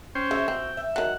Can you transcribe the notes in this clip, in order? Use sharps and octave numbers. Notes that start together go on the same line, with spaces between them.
C#4 C5 G5
C#3 F#4 E5
C4 G5
E5
D#3 F#3 F#5